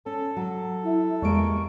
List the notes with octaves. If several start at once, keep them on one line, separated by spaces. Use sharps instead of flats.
C#4 A4
F#3
E4
E2 G3 G#3 A#3 C#6 D7